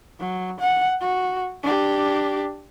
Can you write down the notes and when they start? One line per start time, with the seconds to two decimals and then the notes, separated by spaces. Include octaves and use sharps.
0.20 F#3
0.60 F#5
1.02 F#4
1.63 D4 G4